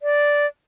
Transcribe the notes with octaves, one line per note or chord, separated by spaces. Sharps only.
D5